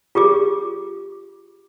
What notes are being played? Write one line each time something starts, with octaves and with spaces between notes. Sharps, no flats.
F4 G4 G#4 D6